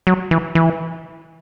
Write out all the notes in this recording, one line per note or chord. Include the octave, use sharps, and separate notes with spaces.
F#3
E3
E3